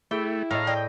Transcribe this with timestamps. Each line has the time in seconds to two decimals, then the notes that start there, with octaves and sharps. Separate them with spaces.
0.11 A3 E4 G#4 G5
0.51 A2 D#5 F5 G5 A#5
0.67 D5 D#5 G5